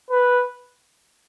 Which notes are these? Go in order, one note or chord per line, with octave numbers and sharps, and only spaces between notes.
B4